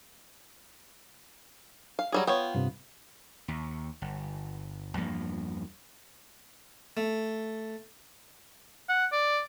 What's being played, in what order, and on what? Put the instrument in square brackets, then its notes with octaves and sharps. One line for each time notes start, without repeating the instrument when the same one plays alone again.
[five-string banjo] F5
F#3 G3 G#4
[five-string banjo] B3 F4 C#5 [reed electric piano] G5
[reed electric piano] G2 C3
[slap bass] D#2
G1
E2 G2 F3 A#3
[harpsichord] A3
[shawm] F#5
D5